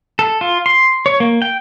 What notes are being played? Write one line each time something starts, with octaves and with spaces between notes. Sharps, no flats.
A4
F4
C6
C#5
A#3
G5